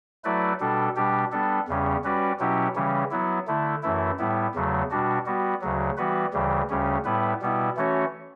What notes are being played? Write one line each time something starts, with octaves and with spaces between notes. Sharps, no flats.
F#3 A3 E4 B4 D5
B2 G3 D4 A4
B2 G3 D4 G4
G3 B3 D4 A4
E2 C#3 G3 C#4
G3 C#4 F#4 B4 D5
B2 F#3 C#4 E4 G4
C#3 E3 G3 C#4
F#3 B3 E4
D3 A3 E4
F#2 E3 A3 E4
A2 G3 B3 E4
E2 C#3 F#3 A3
B2 G3 D4 F#4
G3 B3 F#4
D2 C#3 F#3
E3 G3 B3 F#4 B4
D2 C#3 E3 G3
D2 C#3 G3 C#4
A2 G3 B3 E4 B4
B2 G3 B3 E4
E3 A3 C#4 F#4 C#5